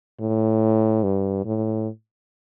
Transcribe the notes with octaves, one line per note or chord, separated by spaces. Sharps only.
A2
G2
A2